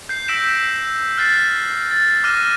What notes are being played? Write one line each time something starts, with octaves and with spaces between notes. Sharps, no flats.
G6 C7
E6 G6 A#6 B6 D7 E7
F6 F#6 A6 C7
A6
D6 F6 F#6 A#6 D#7 E7